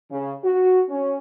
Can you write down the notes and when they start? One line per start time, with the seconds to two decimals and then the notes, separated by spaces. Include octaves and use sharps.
0.11 C#3
0.43 F#4
0.89 C#4